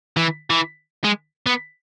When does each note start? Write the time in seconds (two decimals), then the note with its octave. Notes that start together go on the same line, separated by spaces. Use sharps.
0.17 E3
0.50 E3
1.04 G#3
1.46 B3